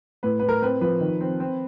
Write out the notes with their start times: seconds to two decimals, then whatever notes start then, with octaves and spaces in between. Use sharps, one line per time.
0.23 A2 B4
0.39 A2 B4
0.49 A#4
0.62 C4 B4
0.81 F3 B4
1.01 D#3
1.21 C4
1.40 C4